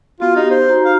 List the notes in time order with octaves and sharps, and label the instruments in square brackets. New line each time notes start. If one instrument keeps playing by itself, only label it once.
[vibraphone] B3 F#4 [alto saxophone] F4
[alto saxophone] D#4 [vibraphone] G4
[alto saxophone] C5
[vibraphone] D#4 F#4 A#5
[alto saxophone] F5